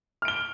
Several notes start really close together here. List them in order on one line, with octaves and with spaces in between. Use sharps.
F6 D7 G7